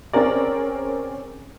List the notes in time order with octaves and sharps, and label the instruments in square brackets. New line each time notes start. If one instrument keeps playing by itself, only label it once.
[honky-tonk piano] C4 C#4 G#4 A#4 D5